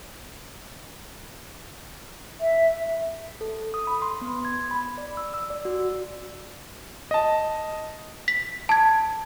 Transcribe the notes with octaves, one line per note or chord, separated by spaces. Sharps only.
E5
A4
D#6
B5
C6
B3
G#6
B5
D5
E6
E6
D5
F#4
D#5 A5
B6
A5 G#6